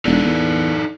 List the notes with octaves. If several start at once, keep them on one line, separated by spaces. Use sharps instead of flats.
E1 D#4 A4 D5
E2